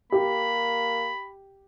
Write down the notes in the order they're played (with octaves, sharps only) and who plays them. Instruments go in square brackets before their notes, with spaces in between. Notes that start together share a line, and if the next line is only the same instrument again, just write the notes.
[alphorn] A#3 [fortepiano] G4 [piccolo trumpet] B5